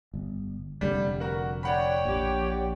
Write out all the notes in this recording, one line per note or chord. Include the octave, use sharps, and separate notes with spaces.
G1
F1 D3 G3
F#4 A#4 F#5
C#5 D5 F#5 G5 B5
A#1 G4